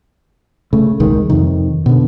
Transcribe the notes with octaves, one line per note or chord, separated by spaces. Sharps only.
C#3 A3
D#1 C2 D#3 G#3
F2 C3 D#3
B2 D3